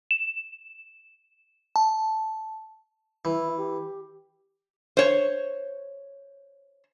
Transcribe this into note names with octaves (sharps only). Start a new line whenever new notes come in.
E7
A5
E3 E4
G4
C5 C#5